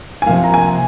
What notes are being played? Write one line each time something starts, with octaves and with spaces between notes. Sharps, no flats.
G#5
C3 F3 A#3 F5
A#5
G#5